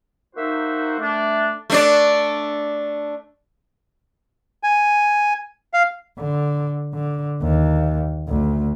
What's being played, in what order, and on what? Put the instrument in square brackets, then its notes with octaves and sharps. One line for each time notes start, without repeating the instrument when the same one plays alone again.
[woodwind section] A#3 D#4 F#4 C5 E5
A3 D4
[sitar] A3 D4 D5
[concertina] G#5
F5
[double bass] D3
D3
D#2
D2